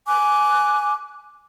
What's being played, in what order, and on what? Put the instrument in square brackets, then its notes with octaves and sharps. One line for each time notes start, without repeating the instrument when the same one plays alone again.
[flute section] G#5 D6 F#6